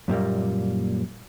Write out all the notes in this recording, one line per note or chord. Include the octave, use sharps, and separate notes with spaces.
F#2 A#2 G3 A#3